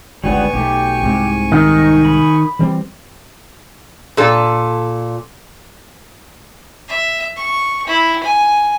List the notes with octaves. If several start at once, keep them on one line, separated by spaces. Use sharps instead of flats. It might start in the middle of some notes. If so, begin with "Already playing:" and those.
G1 C#2 G3 B3 G#5 C#6
B1 A3 G4
C2 G#2 C3
D#3 D#4
B5
E3 G3 C4
A#2 A4
E5
C#6
E4
G#5